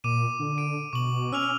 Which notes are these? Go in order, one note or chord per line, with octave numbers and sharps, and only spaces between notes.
A#2 D6 D#7
D3
D7
B2 C#6 F#7
C#4 E6 F6 F7